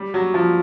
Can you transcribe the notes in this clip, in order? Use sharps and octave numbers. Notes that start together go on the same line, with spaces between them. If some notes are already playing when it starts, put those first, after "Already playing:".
Already playing: G3
F#3
F3